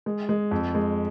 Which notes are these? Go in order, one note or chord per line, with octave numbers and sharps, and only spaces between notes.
G#3
G#3
F2
G#3